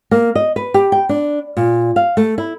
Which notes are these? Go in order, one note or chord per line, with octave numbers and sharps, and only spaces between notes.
A#3
D#5
B4
G4
G5
D4
A#2
F5
A3
E4